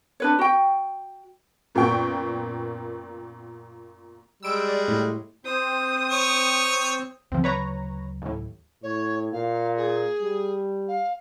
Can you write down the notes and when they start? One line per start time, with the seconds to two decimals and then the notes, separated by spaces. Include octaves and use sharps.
0.20 D4 B4 C#5
0.39 F#4 G5
1.75 F#2 A#2 A#3 B3 G5 C#6
4.43 G3 G#3 E6 D7
4.68 D5
4.88 A2
5.45 C4 C5 D#6
6.11 C#5
7.32 D2 C#3 F3 F#3 C4
7.44 B4 C#5 A#5
8.22 D#2 A2
8.83 A2 C#5
9.32 A#2 F5
9.76 G#4
10.21 G3
10.88 F5